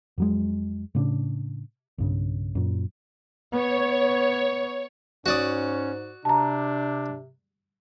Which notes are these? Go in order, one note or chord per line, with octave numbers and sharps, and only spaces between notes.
F2 F#3 G#3
A2 C#3 D4
B1 G2 C#3
F#2 A#2
B3 C#5
G#2 C#4 F#4 D5 D#6
C3 D4 A5 A#5